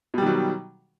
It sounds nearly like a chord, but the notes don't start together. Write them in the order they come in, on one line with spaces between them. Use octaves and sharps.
B2 G3 D#3 F#3